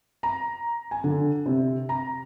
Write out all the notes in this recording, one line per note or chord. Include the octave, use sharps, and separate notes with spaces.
A#5
G#5
D3
C3
A#5